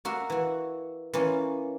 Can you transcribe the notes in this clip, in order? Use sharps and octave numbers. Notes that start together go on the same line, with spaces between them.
A#3 F#4 A#4 E5
E3 F#4
E3 A#3 C#4 F4